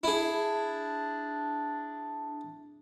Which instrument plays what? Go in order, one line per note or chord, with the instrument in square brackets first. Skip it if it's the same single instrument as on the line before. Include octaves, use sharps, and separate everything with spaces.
[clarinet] D4 [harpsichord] E4 G#4